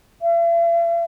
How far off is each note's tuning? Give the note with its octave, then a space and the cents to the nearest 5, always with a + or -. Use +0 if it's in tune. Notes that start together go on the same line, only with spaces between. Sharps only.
E5 +45